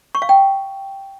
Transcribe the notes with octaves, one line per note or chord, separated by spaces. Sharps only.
C#6
F5
G5